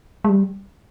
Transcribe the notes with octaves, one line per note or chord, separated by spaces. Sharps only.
G#3
G3